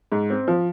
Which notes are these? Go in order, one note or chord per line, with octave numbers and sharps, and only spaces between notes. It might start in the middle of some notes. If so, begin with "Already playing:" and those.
G#2
C4
F3